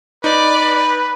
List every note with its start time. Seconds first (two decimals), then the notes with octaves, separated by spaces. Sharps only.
0.24 D#4 B4 D5